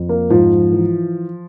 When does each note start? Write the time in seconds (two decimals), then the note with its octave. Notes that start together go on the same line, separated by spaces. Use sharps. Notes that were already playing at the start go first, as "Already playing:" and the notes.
Already playing: F2
0.09 A#3
0.30 G#2 F3
0.72 E3